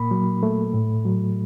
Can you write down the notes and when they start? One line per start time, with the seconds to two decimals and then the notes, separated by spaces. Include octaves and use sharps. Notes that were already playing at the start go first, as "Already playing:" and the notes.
Already playing: A#2 A#3 B5
0.11 F#3
0.43 A3
0.73 A2
1.05 F#3